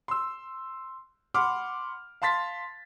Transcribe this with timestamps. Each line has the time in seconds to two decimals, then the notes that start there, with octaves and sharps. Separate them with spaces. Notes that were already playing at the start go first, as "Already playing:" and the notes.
0.08 C6 E6
1.34 F#5 B5 C6 D6 F6
2.22 F5 A5 C6 A6 B6